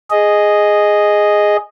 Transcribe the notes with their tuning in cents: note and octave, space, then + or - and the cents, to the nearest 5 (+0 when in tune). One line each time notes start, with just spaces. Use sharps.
G#4 +0 D#5 -5